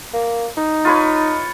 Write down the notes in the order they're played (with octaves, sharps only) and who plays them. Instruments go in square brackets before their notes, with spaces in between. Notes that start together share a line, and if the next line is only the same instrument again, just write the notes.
[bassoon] A#3
D#4
[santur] F4 B4 C#5